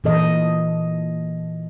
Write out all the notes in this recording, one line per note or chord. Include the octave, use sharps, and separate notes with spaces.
A#2 E3 A4 D#5